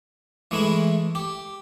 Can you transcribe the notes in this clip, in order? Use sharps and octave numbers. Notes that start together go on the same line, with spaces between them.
E3 G#3 A3 E4
G4